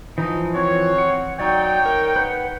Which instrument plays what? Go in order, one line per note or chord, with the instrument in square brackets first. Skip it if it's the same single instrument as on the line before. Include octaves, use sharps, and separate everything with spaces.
[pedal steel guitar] E3 F3 [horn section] D#4
[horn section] C4 F#4 C#5
[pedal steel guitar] F#5
[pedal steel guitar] F#3 D5 [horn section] D#4 C#5 G5
[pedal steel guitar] A#4
B4 F#5